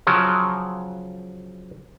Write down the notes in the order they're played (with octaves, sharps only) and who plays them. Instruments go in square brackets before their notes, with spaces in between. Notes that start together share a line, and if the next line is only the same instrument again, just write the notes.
[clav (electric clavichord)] C#3 F3 F#3